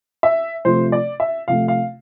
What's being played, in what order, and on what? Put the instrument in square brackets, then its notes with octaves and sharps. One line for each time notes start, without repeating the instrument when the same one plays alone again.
[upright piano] E5
[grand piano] C3 F3 A3 [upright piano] C5
[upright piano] D5
E5
[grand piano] C3 F3 A3 [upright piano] F5
[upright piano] F5